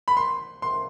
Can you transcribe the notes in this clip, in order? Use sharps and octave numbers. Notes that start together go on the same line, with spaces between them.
B5
C6
C6